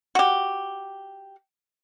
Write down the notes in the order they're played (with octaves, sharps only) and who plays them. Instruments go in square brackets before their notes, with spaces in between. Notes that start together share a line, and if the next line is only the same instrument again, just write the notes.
[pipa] F#4 G4